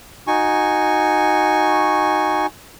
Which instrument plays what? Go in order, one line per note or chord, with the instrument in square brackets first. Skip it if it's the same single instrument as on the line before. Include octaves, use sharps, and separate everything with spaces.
[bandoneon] D#4 F#4 G#5 C#6